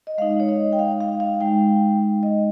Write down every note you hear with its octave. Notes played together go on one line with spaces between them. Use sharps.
D#5
G#3 D#4 F5
C#5
D#5
G5
F5
F5
F5
G#3 D#4 G5
D#5